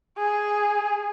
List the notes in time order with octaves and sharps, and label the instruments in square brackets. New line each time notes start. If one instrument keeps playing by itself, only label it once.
[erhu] G#4